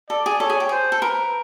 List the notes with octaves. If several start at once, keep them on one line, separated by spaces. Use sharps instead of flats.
A4 D5
G#4
A4 C#5
G#4
G4
G#4 C5
A4
A#4 B4